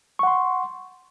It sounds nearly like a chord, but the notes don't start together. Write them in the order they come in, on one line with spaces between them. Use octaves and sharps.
C#6 F#5 C6